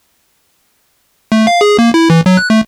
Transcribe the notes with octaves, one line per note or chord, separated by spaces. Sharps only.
A3
F5
G#4
A#3
E4
E3
F#3
F#6
A3